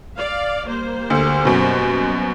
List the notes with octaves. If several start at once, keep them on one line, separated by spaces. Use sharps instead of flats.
D5 F5
G3 A#3 C5
D2
F#2 B2